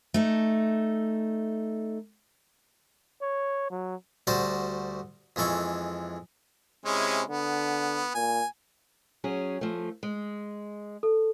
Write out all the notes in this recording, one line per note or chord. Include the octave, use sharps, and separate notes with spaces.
A3 D#4
C#5
F#3
D2 G3 F#4 C5 A5
F2 E3 G#3 A4 C#6
C3 G#3 C#4 E4
D3 B3
A#2 G#5
F#3 C#4 G#4
F3 A3
G#3
A4